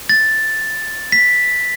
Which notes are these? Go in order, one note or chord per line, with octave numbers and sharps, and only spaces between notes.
A6
B6